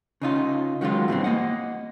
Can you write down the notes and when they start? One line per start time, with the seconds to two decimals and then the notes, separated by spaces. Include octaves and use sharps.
0.22 C#3 D#4 F4
0.81 D#3 F#3 G#3 F4
1.08 G2 B2 E3 C4
1.24 A#3 D#5 F#5